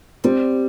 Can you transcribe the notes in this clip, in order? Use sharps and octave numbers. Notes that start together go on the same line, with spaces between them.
G3 C4